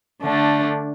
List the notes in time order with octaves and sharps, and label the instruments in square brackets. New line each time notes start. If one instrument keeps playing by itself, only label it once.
[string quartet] D3 A3 D4